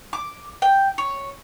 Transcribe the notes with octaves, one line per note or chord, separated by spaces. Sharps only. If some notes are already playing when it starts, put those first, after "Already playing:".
D6
G5
C#5